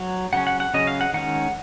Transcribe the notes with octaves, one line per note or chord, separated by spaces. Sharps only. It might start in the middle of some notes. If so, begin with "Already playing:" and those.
Already playing: F#3
C#3 F#3 C#4 F#5
F#5
F#5
C#3 F#3 C#4 D#5
F5
F#5
D#3 G#3 C#4 F#5